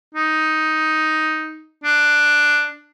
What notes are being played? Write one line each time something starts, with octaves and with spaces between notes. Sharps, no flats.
D#4
D4